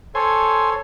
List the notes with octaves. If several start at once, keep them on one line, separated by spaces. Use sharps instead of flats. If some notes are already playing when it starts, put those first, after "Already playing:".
A4 C5 C#5 G#5